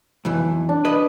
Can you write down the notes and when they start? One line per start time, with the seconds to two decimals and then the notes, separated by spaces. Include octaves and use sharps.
0.25 B1 F2 E3
0.69 D4
0.85 B4 D#5